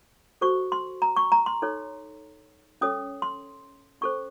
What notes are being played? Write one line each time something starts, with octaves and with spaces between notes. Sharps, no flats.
F#4 A4 C5 C#6
C6
A#5
C#6
A#5
C6
D#4 A4 C#5
C#4 A4 C#5 D#6
C6
C#4 A4 C5 C#6